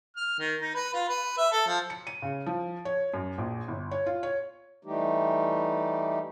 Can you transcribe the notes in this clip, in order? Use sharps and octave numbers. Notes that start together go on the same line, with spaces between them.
F6
D#3
D#4
B4
F4
B4
E5
A4
F3
C#7
D#7
C#3
F3
C#5
F#2
A#1
G1
C#5
F4
C#5
E3 G3 A3 D#4 G4